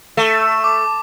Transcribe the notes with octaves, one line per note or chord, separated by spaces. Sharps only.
A3 E7
D6